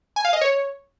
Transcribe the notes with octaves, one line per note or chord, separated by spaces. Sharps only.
G#5
F5
D#5
C#5